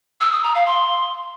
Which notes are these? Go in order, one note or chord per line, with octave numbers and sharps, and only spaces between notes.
E6
D#6
A#5
F5
C6